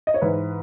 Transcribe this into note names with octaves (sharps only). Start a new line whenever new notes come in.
D#5
C#5
G#2 E3 B4